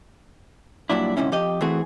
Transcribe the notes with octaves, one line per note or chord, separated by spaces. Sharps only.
G2 A#2 F#3 D4 E4
D2 G#2 C3 C#4 E4
F2 G4 D#5
E3 A3 C4 F#4 G#4